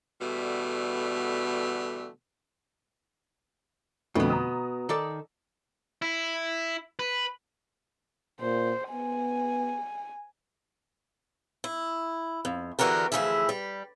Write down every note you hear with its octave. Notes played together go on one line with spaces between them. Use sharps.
B2 D3 E3 G3 A3
F2 B2 D3 A3 B3
A#5 D#6
D#3 A4 D5
E4
B4
A#2 C5
B3 G#5
E4
F2
E2 D3 E3 F#4 G4 A#4
D2 E3 F3 E4 G#4 E5
G3